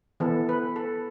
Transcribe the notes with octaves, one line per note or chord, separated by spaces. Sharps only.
E3 B3 A4
B4
A4